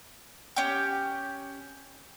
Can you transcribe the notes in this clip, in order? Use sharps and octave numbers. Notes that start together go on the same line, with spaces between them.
C#4 G4